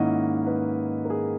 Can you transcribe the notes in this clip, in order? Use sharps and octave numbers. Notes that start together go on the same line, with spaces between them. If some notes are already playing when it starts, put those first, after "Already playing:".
Already playing: G#2 D#3 A#3 C#4 E4 D#5 F#5
B4 D#5
A#4
G#4